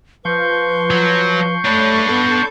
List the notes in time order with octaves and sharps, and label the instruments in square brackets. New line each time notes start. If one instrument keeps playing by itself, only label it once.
[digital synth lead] F3 [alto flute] B4 [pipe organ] C6 C#6 G6
[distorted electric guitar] F#3
[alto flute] A3 [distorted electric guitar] D4 B4 [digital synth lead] C#5
[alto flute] B3 [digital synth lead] A4